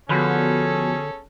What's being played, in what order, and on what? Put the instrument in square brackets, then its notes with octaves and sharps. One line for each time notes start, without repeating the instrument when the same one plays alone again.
[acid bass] D3 [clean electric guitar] F3 B4 [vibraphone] B3 F#4 [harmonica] C#4 G#4 A4